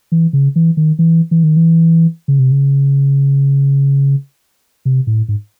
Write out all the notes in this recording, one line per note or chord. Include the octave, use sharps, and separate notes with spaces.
E3
C#3
E3
D#3
E3
E3
D#3
E3
C#3
C3
C#3
C3
A2
G#2